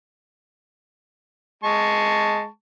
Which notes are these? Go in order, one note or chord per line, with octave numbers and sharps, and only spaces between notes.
G#3 A5 C#6